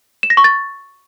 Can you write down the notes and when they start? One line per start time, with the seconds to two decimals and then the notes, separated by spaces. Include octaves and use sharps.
0.23 E7
0.30 A#6
0.37 C#6
0.44 A6